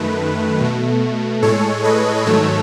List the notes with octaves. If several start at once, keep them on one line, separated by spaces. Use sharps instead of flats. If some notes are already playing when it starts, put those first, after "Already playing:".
Already playing: F#2 D#3 A3 B4
B2 A3
A2 G#3 A4 C#5
B4 D#5
G#2 D#3 F#3 A3 A4 C#5